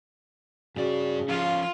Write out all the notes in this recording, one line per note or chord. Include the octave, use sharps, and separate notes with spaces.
G2 C#3 F#4 D5
F3 C#4 F4 F5